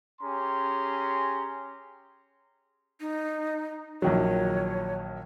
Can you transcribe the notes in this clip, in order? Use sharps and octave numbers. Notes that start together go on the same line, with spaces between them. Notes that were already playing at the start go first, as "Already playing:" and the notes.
C#4 G4 G#4 A#5 C6
D#4
A#1 D#3 F#3 C#5